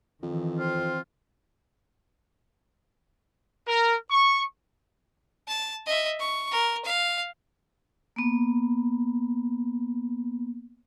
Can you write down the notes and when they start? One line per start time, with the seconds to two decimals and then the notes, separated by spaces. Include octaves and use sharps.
0.23 F2 D#3 E3
0.59 C4 F4
3.66 A#4
4.10 C#6
5.48 A5
5.86 D#5 E5
6.19 C#6
6.52 A#4
6.85 F5
8.16 A#3 B3